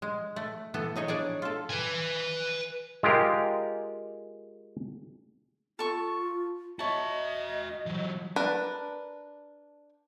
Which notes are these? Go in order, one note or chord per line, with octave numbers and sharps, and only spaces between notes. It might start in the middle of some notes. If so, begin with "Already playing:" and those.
G#3
A3
E3 B3 A4
A2 D#4 G#4 C#5
D4 G#4 C#5 D5
F4 A4
B4 G#5
G#3 F4 G4 A#4
F4 A4 C#6
F#4 C#5 D#5 E5 A5
E3 F#3
D4 A#4 B4